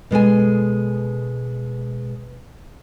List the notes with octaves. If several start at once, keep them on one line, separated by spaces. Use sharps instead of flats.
B2 G#3 A4 G#5